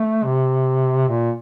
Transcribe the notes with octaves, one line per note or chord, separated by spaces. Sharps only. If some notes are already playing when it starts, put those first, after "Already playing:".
Already playing: A3
C3
A#2